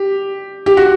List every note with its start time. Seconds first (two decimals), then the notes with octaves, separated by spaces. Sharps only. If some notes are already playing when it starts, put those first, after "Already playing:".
Already playing: G4
0.66 G4
0.77 F#4